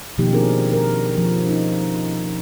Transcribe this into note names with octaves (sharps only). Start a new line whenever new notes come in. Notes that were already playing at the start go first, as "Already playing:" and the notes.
B2 D#3 F3 A#3 D#4 G4
C4 D4 D#4 G#4 A#4
A#4
F3
C#4 D#4